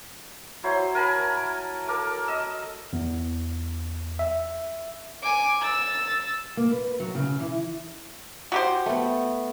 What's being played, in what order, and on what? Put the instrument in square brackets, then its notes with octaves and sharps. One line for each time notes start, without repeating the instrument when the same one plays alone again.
[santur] F#3 E4 C5
A#4 G#5 A5 B5
A4 A#4 D6
D#5 E6
[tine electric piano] E2
E5
[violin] G#5 D6
E6 A6
[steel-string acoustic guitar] A#3
B4
F#3
C#3
E3
[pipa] F#4 G4 C5
[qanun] A3 B3